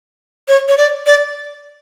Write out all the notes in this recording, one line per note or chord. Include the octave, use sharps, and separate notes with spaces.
C#5
C#5
D5
D5